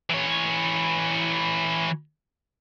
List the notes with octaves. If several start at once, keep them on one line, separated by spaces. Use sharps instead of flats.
E3 C#5